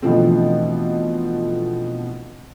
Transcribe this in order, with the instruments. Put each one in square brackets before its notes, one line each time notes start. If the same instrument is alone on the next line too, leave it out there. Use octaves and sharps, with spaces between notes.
[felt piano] B2 D3 E3 F3 A3 C4